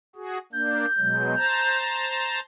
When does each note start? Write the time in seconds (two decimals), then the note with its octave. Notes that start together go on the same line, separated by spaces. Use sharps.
0.16 F#4 G#4
0.53 A#3 D4 G6
0.98 B2 F#3 G#3
1.37 C5 A5 A#5